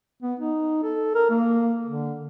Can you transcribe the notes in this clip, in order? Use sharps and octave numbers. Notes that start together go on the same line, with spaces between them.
B3
D#4
A4
A#4
A#3
D3